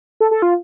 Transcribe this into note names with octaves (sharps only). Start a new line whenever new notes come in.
A4
A4
F4